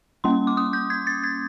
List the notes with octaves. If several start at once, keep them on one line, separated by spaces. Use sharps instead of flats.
G3 A#3 C#4 C6
D6
D#6
G6
G#6
A6
G#6